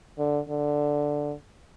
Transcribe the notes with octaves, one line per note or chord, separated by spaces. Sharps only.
D3
D3